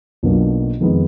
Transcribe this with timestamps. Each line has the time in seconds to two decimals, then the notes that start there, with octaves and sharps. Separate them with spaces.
0.23 B1 B2 A#3 D4 F4
0.80 F2 D#3 G#3 B3